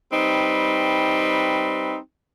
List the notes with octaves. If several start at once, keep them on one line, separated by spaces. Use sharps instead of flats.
G3 C4 D#4 B4